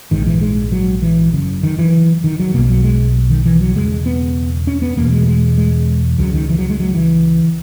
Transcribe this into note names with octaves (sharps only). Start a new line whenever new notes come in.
A#1 G#2 D#3
E3
G#3
F#3
E3
F#1 F#2 C#3
D#3
E3
D#3
F#3
B1 B2 A#3
F#3
G#3
D#3
E3
F#3
E1 D#2 C#3 G#3
B3
C#4
B3
E1 E2 B2 A#3
G#3
G#3
G#3
C#2 C#3 F#3
D#3
E3
F#3
G#3
F#3
E3